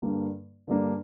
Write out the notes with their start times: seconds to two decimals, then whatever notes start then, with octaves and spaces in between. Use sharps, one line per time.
0.02 G2 D3 G3 A#3 D4
0.67 G2 D3 G3 A#3 D4